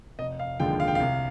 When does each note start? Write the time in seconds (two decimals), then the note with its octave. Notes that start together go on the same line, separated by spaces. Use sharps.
0.19 F1 D#5
0.39 F5
0.60 D#2 D3 F3 G#3 G5
0.80 F5
0.88 G5
0.95 C2 F5